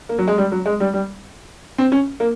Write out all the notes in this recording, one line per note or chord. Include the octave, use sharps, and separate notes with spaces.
A#3
F#3
G#3
G3
F#3
G#3
G3
G3
C4
C#4
A#3